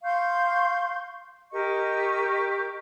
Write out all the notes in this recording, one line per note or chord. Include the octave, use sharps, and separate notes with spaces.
F5 C6 C#6 G6
G4 A#4 D#5 C#6